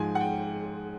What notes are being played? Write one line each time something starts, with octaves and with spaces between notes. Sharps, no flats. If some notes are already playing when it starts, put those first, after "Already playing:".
Already playing: G#2 F3 G#3 G#5
F#5
G5